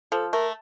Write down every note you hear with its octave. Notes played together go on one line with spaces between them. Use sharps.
F3 A4
A3 A#4